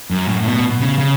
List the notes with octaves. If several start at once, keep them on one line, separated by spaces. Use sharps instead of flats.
F#2
A2
B2
C#3
C#3